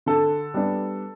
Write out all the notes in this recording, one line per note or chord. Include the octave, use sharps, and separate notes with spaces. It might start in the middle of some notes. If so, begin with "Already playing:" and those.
D3 A4
G3 B3 D4